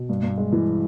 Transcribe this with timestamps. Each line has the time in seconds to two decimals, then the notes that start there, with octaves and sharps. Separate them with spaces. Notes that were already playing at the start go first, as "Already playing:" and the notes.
Already playing: B2
0.09 G2
0.23 G2
0.38 G#3
0.52 E3